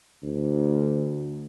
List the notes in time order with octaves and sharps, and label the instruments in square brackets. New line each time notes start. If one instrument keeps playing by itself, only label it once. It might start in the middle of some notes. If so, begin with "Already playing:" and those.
[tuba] D2